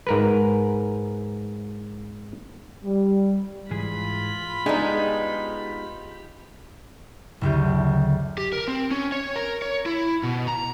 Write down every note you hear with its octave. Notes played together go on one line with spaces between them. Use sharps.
G#2 A#4 B4
G3
G#2 E3 F4 G#4 B5
G#3 B3 D4 D#4 G4 G#4
F#1 D2 G4
G4
A#4
C4
C#4
C#5
A#4
C#5
E4
B2
A#5